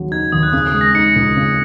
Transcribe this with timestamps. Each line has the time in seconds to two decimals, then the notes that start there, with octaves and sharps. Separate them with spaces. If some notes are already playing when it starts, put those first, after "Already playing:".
Already playing: D#2 C#3 F#3
0.11 D#4 G#6
0.32 D#2 D#6
0.43 F#6
0.53 C#3 D#6
0.67 D#6
0.74 G#3
0.81 A#6
0.94 D#4 C#7
1.16 C#2
1.37 C#3